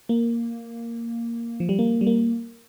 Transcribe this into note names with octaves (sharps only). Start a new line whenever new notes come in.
A#3
F3
G3
A#3
G3
A#3